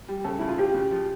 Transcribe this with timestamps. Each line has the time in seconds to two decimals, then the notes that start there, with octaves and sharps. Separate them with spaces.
0.08 G3
0.24 C#3 A4
0.39 C#3 E4
0.48 F4
0.58 C#3 G4
0.74 C#3
0.91 F3